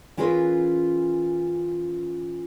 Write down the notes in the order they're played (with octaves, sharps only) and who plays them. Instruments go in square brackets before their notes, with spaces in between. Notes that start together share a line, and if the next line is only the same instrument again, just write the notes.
[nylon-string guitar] E3 C#4 F4 G#4 A#4 B4